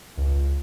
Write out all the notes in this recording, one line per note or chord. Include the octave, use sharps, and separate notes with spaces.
C#2